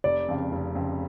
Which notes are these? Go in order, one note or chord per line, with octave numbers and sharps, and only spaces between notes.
F1 D5
F2 C#3
F1
F2 C#3